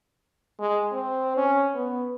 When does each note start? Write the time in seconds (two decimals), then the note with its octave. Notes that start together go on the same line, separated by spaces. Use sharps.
0.59 G#3
0.93 C4
1.37 C#4
1.75 B3